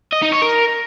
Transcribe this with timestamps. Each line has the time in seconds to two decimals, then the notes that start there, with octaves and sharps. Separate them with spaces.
0.13 D#5
0.22 D#4
0.32 C#5
0.42 A#4